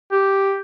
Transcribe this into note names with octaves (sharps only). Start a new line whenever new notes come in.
G4